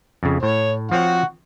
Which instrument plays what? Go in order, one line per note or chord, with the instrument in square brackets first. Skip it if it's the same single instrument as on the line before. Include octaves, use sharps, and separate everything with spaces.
[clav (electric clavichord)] F2 C#3
[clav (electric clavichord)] A2 [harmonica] C#5
[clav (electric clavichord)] F3 C4 C#5 [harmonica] F#5 C#6